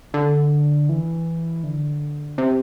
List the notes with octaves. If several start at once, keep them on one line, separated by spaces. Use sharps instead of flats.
D3
E3
D3
C3